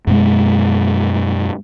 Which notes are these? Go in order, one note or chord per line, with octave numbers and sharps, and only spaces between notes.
F#2 B2 G#3